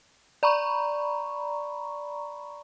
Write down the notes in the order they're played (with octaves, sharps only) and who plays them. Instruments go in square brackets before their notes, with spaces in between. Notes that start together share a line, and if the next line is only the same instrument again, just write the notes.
[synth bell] D5 A#5 B5 C#6